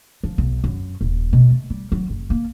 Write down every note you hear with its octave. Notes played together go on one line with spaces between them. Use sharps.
F3
B1
F#2
D#1
B2
A3
G3
F#3
F#1
A#3